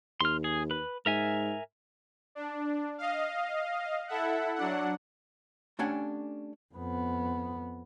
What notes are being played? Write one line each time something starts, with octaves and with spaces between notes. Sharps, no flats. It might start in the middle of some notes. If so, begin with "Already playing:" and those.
D#2 C6 F6
G#4
B4
G#2 A#4 E5 G#5
D4
D#5 F5
E4 A4 E5 F#5
F#3 D4 F#5
A3 C#4 D4 G4 F#5 G#5
F2 B3